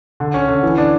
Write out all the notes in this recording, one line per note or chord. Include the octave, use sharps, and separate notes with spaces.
D3
C#4
D3
E3
D4